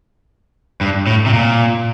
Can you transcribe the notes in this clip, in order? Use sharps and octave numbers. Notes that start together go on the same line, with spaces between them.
G2
A2
C3
A#2